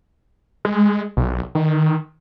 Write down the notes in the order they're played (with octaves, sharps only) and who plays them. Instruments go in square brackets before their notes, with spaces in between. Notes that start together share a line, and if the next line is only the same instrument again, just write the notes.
[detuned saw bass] G#3
B1
D#3